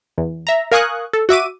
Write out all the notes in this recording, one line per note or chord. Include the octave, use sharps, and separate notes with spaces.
E2
E5 A#5
A#4 F5 G#5 C#6 D#6 F#6
A4
F#4 E5 D6 D#7